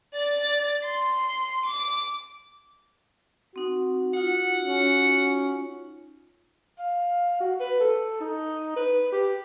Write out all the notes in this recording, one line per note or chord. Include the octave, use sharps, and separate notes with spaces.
D5 A6
C6
D6
C4 D#4 F#4
D#4 F4 F#5
C#4
F5
F#4
B4
A4
D#4
B4
G4